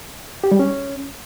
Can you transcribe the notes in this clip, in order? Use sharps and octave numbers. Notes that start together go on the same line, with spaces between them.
G4
G3
C#4